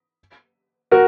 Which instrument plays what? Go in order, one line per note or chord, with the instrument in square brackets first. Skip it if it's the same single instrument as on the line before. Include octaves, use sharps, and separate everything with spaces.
[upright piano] F#4 A#4